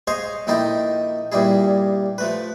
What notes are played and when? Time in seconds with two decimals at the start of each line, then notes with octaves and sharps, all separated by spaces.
0.07 G#4 C5 C#5 D#5 F5 G#5
0.47 A#1 D#3 D#4 E4 A4 G5
1.32 G2 A#2 G3 E4 G#4
2.18 F3 A3 B4